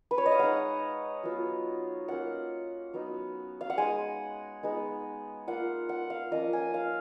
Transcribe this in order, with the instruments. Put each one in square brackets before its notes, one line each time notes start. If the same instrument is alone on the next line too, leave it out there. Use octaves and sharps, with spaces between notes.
[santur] B4
C#5
D#5
F5
G#3 D#4 F#5
F#3 B3 F4
A#3 C#4 F4 F#5
F#3 B3 D#4
F5
F#5
G#3 D#4 G#5
G#3 B3 D#4
A#3 F4 F#5
F#5
F5
F3 A#3 C#4 F4 D#5
G#5
F5